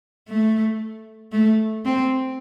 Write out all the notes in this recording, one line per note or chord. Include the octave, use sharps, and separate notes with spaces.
A3
A3
C4